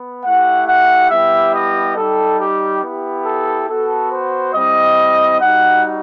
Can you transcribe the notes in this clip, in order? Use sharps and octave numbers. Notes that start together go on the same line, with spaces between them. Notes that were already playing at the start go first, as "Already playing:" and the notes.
Already playing: B3
A3 E4 G4 F#5
F#5
G3 B3 E4 G4 E5
D#5
G3 D#4 G4 A4
G4
B3 E4 G4
A4
B3 F#4 A4
C5
G3 C4 E4 D#5
G3 D#4 F#4 F#5